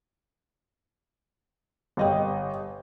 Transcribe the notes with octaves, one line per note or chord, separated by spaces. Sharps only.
G1 D#5 G5